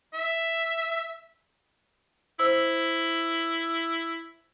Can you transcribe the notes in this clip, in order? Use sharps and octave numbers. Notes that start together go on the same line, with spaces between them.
E5
E4 C5 E6